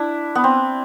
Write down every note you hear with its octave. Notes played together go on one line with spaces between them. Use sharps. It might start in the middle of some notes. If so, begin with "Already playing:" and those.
Already playing: D4 E4
B3
C4